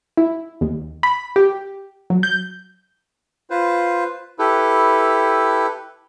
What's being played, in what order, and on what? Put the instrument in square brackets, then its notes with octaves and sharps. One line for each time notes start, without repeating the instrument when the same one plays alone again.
[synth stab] E4
D#2
B5
G4
F#3
G6
[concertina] F4 B4 C5
E4 G4 A4 B4